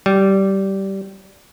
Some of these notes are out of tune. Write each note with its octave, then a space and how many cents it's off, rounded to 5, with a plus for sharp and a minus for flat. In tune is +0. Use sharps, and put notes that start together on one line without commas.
G3 -15